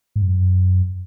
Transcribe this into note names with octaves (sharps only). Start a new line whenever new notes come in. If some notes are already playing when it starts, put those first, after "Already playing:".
G#2
F#2